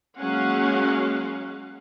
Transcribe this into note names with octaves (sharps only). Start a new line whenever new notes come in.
F#3 G#3 A#3 C#4 F5 F#5